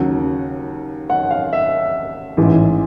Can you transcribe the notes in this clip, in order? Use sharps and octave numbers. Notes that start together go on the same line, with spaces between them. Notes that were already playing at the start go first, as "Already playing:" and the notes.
Already playing: D#2 C#3 F#3 F#5
F#5
F5
E5
A1 G#2 E3